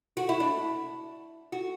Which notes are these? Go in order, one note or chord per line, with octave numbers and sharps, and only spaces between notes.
F#4
E4
D4
F#4